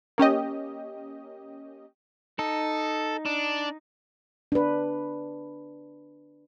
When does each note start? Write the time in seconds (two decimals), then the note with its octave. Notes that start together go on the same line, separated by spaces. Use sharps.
0.18 A#3 C#4 G4 D#5
2.39 D#4 A4
3.26 D4
4.52 D4 B4